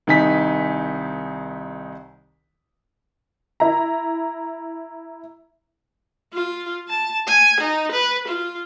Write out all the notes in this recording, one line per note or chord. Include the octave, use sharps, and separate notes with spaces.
C2 D#3 D#4 G#5 B6
E4 A#5
F4
A5
G#5
D#4
B4
F4